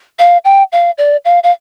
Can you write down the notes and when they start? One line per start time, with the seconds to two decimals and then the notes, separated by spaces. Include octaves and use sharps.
0.19 F5
0.45 G5
0.72 F5
0.98 D5
1.25 F5
1.43 F5